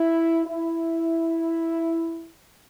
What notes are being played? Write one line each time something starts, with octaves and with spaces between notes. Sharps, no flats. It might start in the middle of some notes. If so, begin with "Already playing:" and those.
Already playing: E4
E4